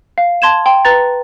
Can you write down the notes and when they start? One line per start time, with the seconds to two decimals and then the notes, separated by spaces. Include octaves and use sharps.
0.18 F5
0.42 A5 C6 G#6 E7
0.66 G5 C6
0.85 B4 A#5 A6